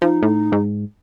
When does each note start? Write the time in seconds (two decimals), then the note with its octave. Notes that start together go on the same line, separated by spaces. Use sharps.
0.02 F3 D#4
0.23 A2
0.52 G#2